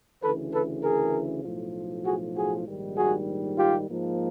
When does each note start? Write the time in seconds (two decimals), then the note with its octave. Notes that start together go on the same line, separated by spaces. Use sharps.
0.23 D2 C#3 E3 A4 B4
0.53 A4 B4
0.84 G#4 A#4
1.45 B1 A2 F3
2.06 F#4 G#4
2.36 F#4 G#4
2.67 A#1 G#2 D#3 G3
2.97 F#4 G#4
3.57 F4 G4
3.89 G#2 F3 A#3